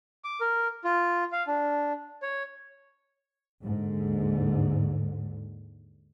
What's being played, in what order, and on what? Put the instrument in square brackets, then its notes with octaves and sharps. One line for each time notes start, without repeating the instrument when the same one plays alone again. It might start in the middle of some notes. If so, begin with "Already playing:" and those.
[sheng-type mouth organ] D6
A#4
F4
F5
D4
C#5
[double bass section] D#2 G#2 D3